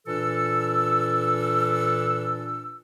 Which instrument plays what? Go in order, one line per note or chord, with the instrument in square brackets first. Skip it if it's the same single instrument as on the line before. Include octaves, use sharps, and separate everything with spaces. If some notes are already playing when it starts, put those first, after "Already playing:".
[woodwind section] A#2 E3 D4 A4 E6